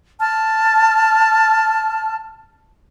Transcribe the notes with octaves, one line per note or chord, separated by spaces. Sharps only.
A5 F6